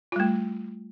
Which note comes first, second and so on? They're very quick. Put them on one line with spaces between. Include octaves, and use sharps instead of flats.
F4 G3 A3